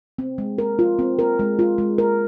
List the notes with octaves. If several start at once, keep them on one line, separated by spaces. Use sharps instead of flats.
C4
G#3
A#4
F4
C4
A#4
G#3
F4
G#3
A#4